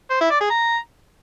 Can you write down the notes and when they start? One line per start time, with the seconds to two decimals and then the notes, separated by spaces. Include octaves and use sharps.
0.10 C5
0.20 E4
0.30 D5
0.40 G#4
0.50 A#5